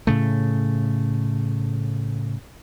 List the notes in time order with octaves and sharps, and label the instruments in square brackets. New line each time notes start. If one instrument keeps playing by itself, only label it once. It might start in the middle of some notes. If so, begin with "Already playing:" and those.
[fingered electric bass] A2 C#3 A3